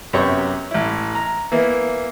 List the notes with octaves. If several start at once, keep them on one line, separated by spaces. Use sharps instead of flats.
F#2 C3 B3 G4 C#5 C#6
A1 E4
A#5
E3 A#3 B3 E4